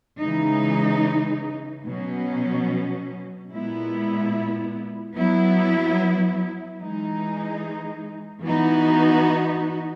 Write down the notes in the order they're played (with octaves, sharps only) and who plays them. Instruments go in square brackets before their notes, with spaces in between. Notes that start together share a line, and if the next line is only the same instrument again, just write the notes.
[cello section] C#3 E3 G#3 D#4
B2 F#3 C#4
A#2 G#3 B3 E4
F#3 B3 E4
E3 G#3 D#4
E3 B3 D#4 F#4